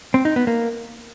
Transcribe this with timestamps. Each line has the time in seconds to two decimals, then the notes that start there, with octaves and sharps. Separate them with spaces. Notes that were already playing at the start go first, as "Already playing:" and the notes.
0.14 C4
0.25 D#4
0.36 B3
0.47 A#3